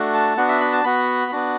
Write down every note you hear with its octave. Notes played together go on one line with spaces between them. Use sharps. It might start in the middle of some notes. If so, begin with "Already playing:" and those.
Already playing: A3 D4 F#4
A5
B3 D4 F#4 F#5
E5
B5
A5
B3 F#4 B5
B3 D4 F#4